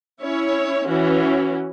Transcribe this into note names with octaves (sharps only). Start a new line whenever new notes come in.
C#4 E4 C#5
E3 C#4 F#4